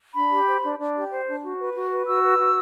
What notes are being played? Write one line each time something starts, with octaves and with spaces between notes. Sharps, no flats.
D4 B5
G4
C5
D4
D4
G4
C5
D4
F#4
B4
F#4
B4
F#4 E6
B4
F#4